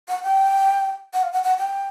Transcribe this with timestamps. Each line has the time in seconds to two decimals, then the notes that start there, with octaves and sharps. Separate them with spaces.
0.08 F#5
0.23 G5
1.13 F#5
1.23 F5
1.33 F#5
1.43 F#5
1.58 G5